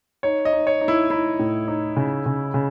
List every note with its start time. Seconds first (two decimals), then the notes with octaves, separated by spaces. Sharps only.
0.23 D#4 C#5
0.45 D#5
0.52 D#4
0.67 C#5
0.81 D#4
0.88 E4
1.10 D#4 E4
1.39 A2
1.68 D#4
1.97 C#3
2.26 C#3
2.54 C#3